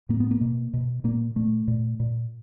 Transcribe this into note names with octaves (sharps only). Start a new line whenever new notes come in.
A2 A#3
B3
A#3
B2
B2
A#2 A#3
A#2 A3
A#2
A#2